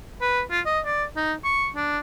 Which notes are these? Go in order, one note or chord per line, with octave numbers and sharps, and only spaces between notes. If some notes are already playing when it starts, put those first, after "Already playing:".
B4
F4
D#5
D5
D#4
C#6
D4